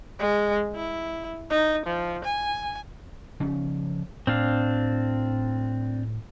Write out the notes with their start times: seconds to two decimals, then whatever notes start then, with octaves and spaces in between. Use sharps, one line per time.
0.19 G#3
0.75 E4
1.50 D#4
1.86 F3
2.24 G#5
3.40 C#3 F3 C#4
4.27 A2 C4 D4 F5